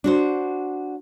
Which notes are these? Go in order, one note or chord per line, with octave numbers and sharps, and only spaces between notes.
D4 F#4 C5